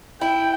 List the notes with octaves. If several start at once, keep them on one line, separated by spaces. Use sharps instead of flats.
E4 G5